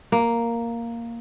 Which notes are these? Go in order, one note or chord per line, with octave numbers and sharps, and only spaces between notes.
A#3